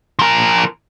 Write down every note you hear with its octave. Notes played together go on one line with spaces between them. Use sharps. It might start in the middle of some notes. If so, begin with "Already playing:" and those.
F3 A#4